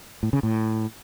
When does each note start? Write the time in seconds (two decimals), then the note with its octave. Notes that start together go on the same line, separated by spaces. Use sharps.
0.23 A2
0.33 C#3
0.43 A2